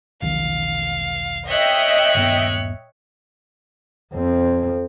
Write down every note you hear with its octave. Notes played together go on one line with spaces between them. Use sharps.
E1 B1 D#3 F5
C#5 D#5 E5 G5 F#6
D#1 G2 B3
F2 C4